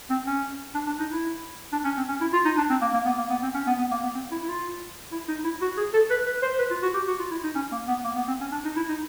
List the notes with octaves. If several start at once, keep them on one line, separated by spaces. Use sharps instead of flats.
C4
C#4
D4
D4
D#4
E4
D4
C#4
C4
C#4
E4
F4
D#4
D4
C4
A#3
A#3
B3
A#3
B3
C4
C#4
B3
B3
A#3
B3
C4
E4
E4
F4
E4
D#4
E4
F#4
G#4
A4
B4
B4
C5
B4
F4
F#4
G4
F#4
F4
E4
D#4
C#4
A#3
B3
A#3
B3
C4
C#4
D4
D#4
E4
D#4